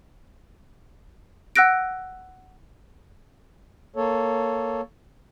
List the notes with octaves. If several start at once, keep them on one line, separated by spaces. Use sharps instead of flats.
F#5 E6 F#6 A#6 D7
A#3 A4 C#5